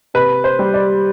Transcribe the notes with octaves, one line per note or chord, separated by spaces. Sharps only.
C3 B4
C5
G3
D5